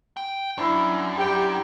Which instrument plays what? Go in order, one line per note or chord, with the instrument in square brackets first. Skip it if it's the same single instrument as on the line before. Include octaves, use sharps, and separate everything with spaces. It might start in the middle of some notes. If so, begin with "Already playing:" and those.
[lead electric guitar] G5
[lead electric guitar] F#2 [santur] D4 E4
[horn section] G4 G5 [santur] D5